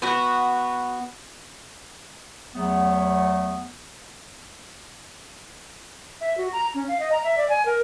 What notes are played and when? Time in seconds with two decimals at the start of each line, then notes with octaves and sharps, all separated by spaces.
0.02 B3 F#4
2.54 E2 F#3 A3 B3
6.21 E5
6.38 F#4
6.53 A#5
6.75 C#4
6.88 F5
7.00 D#5
7.12 A#5
7.24 E5
7.38 D5
7.49 G#5
7.66 A#4